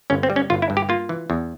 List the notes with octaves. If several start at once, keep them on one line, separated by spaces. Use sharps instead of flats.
G1 C#4
C4
G3
C#4
G1 F4
E4
G2
G4
A#3 F4
E3
E2